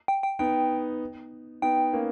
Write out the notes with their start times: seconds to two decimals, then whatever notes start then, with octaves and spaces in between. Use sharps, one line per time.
0.08 G5
0.23 G5
0.39 B3 D#4 G5
1.62 B3 D#4 G5
1.93 A#3 C#4